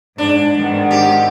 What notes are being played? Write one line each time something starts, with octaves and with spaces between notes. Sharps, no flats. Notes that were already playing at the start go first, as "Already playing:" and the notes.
G#2 D4
G#2 D#3 G#3 B3 D5 F#5
B2 F#3 C4 G4